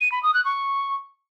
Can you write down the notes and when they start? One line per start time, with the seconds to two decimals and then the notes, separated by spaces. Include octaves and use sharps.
0.01 D#7
0.12 B5
0.23 D#6
0.34 F#6
0.45 C#6